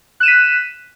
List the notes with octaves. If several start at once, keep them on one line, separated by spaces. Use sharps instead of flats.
F#6 B6 D#7 E7